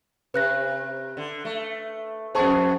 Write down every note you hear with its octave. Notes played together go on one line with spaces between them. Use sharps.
C3 B4 F#6 A#6
D3
A3
F2 B3 G#4 C5 A5 C#6